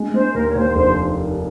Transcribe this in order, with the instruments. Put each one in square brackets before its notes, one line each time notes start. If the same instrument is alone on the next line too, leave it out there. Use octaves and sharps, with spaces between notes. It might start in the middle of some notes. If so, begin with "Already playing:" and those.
Already playing: [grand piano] G#3
[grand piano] G#3 [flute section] C5
[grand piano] D#2 [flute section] A#4
[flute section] C#5
[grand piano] D#2 [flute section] C5
[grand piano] F1 [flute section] C5